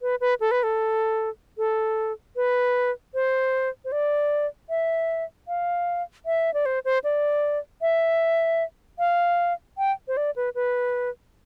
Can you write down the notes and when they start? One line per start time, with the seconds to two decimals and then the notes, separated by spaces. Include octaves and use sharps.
0.02 B4
0.21 B4
0.40 A4
0.51 B4
0.63 A4
1.58 A4
2.36 B4
3.14 C5
3.85 C5
3.92 D5
4.69 E5
5.48 F5
6.26 E5
6.54 D5
6.66 C5
6.85 C5
7.04 D5
7.82 E5
8.99 F5
9.78 G5
10.08 C5
10.17 D5
10.36 B4
10.55 B4